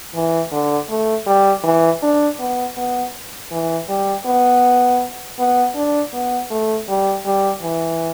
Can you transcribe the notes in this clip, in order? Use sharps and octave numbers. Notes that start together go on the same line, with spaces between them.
E3
D3
A3
G3
E3
D4
B3
B3
E3
G3
B3
B3
D4
B3
A3
G3
G3
E3